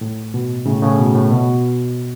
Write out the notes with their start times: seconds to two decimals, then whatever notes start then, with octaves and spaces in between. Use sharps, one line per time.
0.01 A2
0.34 B2
0.66 A2 C#3
0.82 A2 C#3
0.99 B2
1.15 A2
1.31 B2